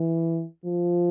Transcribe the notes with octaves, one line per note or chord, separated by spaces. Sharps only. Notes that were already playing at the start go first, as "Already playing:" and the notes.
Already playing: E3
F3